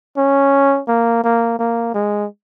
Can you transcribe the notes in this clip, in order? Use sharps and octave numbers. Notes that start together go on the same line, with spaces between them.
C#4
A#3
A#3
A#3
G#3